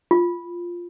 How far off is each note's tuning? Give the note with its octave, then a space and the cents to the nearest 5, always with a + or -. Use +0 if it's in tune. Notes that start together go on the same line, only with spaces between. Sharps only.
F4 +0